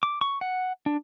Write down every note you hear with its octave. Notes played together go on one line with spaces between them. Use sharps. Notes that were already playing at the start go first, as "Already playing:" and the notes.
D6
C#6
F#5
D4